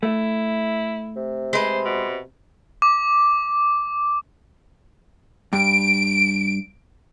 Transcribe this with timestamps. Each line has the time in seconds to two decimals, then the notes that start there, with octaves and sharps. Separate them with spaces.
0.03 A3 E4
1.16 C3
1.53 G#3 B4 C5
1.85 B2
2.82 D6
5.53 G2 D7